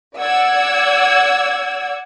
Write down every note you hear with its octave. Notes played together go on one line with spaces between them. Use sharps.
D5 F#5 E6 G#6